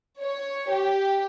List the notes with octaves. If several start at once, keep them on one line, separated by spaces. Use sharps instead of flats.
C#5
G4